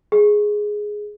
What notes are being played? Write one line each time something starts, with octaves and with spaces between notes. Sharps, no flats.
G#4